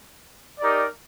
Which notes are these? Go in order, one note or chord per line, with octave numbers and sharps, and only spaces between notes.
D#4 G4 A#4 D5